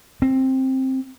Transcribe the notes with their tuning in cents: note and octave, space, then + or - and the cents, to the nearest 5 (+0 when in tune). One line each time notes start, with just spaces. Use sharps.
C4 +10